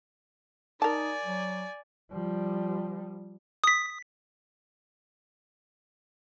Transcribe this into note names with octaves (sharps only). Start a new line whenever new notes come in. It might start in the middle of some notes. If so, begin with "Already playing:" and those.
D#4 A#4 D5 G#5 A5
F#3
F3 G3
D#6 B6